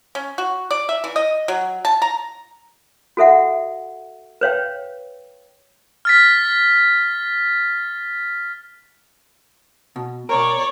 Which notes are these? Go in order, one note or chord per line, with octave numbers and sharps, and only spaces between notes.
C#4
F#4
D5
E5
E3
D#5
F#3
A5
A#5
F#4 A4 E5 F#5
B4 C#5 F5 G5
F6 A6 B6
B2
B2 A#4 C#5 D5